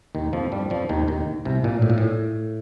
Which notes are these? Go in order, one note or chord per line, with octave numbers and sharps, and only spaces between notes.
D#2 D#3
F2 F3
G2 G3
F2 F3
D#2 D#3
D#2 D#3
C2 C3
A#1 A#2
A2
A#2
A2